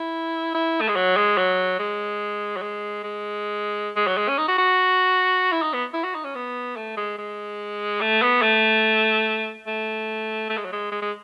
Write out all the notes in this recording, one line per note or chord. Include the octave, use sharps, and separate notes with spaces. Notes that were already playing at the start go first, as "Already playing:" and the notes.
Already playing: E4
E4
A3
G#3
F#3
G#3
F#3
G#3
F#3
G#3
G#3
G#3
F#3
G#3
C#4
D#4
F#4
F#4
E4
D#4
B3
E4
F#4
D#4
C#4
B3
A3
G#3
G#3
A3
B3
A3
A3
A3
G#3
F#3
G#3
G#3
G#3